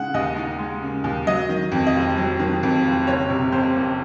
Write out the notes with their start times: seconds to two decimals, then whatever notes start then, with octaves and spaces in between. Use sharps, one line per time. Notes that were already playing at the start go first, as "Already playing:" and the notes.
Already playing: C#3 G#3 D#4 F#5
0.14 D#2 D#5
0.36 D#4
0.59 G#3
0.82 C#3
1.04 D#2
1.27 F#3 D#5
1.49 D#3
1.72 F2
1.87 D#5
1.95 F1
2.17 F#3
2.40 D#3
2.63 F2
2.85 F1
3.07 F#1 C#5
3.30 C3
3.52 F2 C5
3.76 F#1